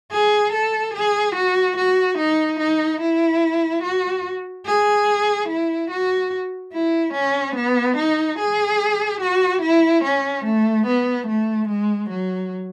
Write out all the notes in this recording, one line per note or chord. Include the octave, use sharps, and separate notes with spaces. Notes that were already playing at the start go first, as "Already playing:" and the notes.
G#4
A4
G#4
F#4
F#4
D#4
D#4
E4
F#4
G#4
E4
F#4
E4
C#4
B3
D#4
G#4
F#4
E4
C#4
A3
B3
A3
G#3
F#3